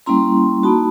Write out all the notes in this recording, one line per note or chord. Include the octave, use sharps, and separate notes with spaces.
G3 A#3 C#4 E4 A#5 C6
A#3 D#4 F#4 A5 B5